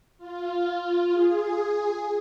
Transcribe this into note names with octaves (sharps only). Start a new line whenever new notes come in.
F4
G#4